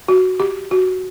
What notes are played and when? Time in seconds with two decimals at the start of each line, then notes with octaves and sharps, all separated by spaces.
0.08 F#4
0.40 G4
0.71 F#4